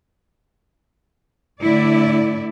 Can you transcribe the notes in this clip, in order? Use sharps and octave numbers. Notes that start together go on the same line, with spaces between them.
A2 D3 E4 D5